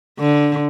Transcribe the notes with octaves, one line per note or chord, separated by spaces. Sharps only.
D3